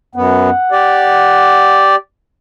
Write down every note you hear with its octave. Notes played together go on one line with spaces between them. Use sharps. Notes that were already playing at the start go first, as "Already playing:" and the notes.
F#2 B3 F#5
G4 D5